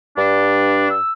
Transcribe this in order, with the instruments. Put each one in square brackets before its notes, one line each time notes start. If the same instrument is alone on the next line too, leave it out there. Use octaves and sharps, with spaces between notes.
[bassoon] G2 [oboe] D4
[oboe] E6